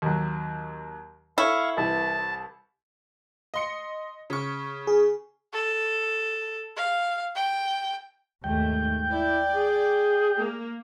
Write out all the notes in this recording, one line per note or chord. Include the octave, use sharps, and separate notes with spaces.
D#2 F#3
E4 A4 C#5 F5 C#6
C2 E3 A5
D#5 C6 C#7
C#3 C#6
G#4
A4
F5
G5
D#2 G#2 A3 G5
E4 D5
G#4
A#3